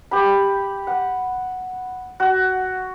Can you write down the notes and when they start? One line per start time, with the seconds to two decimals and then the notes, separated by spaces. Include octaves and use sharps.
0.11 G4 B5
0.87 F#5
2.20 F#4